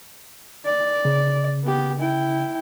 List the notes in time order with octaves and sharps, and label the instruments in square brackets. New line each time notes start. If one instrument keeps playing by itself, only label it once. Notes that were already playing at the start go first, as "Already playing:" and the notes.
[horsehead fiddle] D5
[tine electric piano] C#3
[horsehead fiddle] B3 G4
E4 G5